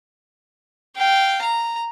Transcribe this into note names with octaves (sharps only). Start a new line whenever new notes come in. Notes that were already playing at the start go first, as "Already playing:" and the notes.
F5 G5
A#5